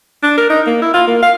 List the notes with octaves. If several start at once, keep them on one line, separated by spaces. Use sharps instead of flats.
D4
A#4
D#4
A#3
E4
F4
A#3
F5